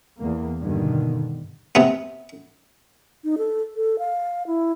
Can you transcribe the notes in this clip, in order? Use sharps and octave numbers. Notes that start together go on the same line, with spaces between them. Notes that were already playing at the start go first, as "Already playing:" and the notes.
E2 A#3
G2 B2 D3 D#3
C3 B3
D#4
A4
A4
F5
E4